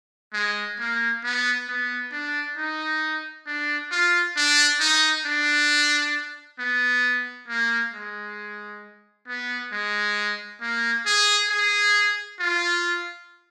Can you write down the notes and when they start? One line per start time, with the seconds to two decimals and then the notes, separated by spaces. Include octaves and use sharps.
0.34 G#3
0.79 A#3
1.23 B3
1.68 B3
2.12 D4
2.57 D#4
3.47 D4
3.91 F4
4.36 D4
4.80 D#4
5.25 D4
6.59 B3
7.48 A#3
7.94 G#3
9.28 B3
9.72 G#3
10.61 A#3
11.06 G#4
11.50 G#4
12.40 F4